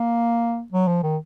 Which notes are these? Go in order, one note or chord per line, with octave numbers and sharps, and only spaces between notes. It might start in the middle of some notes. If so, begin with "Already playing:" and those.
Already playing: A#3
F#3
F3
D#3